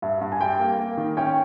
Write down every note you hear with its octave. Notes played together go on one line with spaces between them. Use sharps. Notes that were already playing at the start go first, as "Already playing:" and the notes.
G2 E5
G2
G#5
G3 G5
A#3
A#3
D#3
C#4 G5